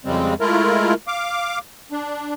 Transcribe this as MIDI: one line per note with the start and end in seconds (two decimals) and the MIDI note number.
0.05 0.34 41
0.05 0.34 49
0.05 0.34 55
0.05 0.34 56
0.05 0.34 60
0.40 0.94 56
0.40 0.94 57
0.40 0.94 64
0.40 0.94 65
0.40 0.94 70
1.07 1.58 77
1.07 1.58 86
1.92 2.34 62